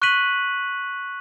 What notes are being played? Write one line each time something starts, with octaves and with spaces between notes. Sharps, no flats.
C#6 F#6 B6 D#7 F#7